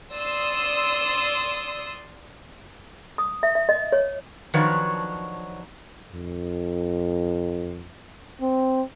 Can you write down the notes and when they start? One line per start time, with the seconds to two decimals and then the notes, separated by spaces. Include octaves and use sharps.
0.15 D5 C6 D#6 E6
3.18 D#6
3.43 E5
3.55 E5
3.69 D#5
3.92 C#5
4.54 D#3 F3 F#3 D4 B4 C#5
6.13 F2
8.41 C4